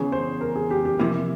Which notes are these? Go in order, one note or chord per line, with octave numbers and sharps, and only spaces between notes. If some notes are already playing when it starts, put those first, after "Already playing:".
Already playing: E2 C#3 E3 G#4
C5
A#4
G#4
G4
G4
F2 C3 E3 A#3 E4